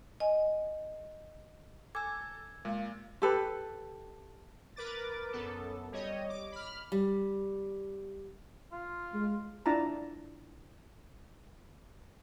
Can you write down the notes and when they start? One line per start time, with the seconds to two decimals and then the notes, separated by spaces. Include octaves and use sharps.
0.20 D#5 G#5
1.95 A4 G#5 D6 E6 G#6
2.65 A#2 G#3 F5
3.22 G4 A4 B4
4.76 A#4 B4 D6 A6
5.32 F#2 B3 A4
5.92 G3 C#5 D#5
6.29 D6
6.52 B5 F6
6.92 G3
8.72 F4
9.13 G#3
9.66 D4 E4 F4 A5 A#5